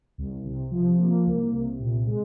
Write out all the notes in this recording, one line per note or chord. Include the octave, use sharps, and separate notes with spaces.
C2
C3
F3
A#3
C2
C3
A#2
G#3